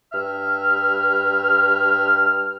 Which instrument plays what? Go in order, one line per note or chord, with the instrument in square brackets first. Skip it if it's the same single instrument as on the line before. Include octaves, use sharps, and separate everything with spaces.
[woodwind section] G2 E5 F6